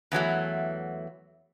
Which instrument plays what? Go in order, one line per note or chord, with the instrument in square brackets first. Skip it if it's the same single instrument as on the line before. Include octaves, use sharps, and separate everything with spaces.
[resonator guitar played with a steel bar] E2 E3 F#3 A3